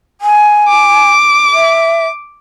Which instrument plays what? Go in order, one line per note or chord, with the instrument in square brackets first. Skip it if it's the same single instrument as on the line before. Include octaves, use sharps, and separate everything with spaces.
[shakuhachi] G#5
[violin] D6
[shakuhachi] E5